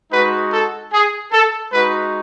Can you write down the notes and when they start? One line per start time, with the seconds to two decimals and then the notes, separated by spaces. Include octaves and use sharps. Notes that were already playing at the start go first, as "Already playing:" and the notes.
0.11 G#3 D#4 F#4 B4
0.52 A4
0.92 G#4
1.32 A4
1.73 G#3 D#4 F#4 B4